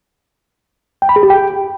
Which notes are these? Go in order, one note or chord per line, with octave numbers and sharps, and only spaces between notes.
G5
B5
G#4
G4
G5